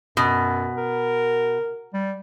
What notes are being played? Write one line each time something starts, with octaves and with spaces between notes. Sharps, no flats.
F#2 B2
A#4
G3